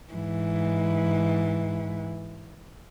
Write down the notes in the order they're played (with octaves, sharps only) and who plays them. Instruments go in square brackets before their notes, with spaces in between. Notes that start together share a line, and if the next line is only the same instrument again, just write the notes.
[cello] G#2 E3